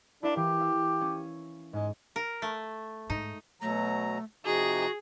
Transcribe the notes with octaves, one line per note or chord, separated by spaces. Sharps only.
D4 E4 A#4 F5
E3 G4
F5 E6
C#4
G#2 G#3
A#4
A3
G#2 D#4
B2 F#3 A3 A#5
C3 F3 D#4 F#4 G#4